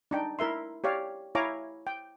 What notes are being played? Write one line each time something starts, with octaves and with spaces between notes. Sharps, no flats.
D4 D#4 G5
E4 A#4 E5 C6
G4 C#5 D5 F5
E4 C#5 F5 G#5 A#5 D6
G5